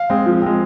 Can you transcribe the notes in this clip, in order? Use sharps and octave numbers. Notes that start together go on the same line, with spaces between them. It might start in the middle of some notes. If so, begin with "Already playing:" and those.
Already playing: F5
G#3 C4
F3
G#3 C4